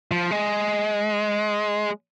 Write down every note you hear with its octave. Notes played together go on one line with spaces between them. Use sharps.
F3
G#3